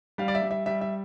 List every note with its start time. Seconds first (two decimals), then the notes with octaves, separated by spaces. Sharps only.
0.18 G3 F5
0.28 D5
0.35 E5
0.42 G3
0.51 E5
0.66 G3 E5
0.81 E5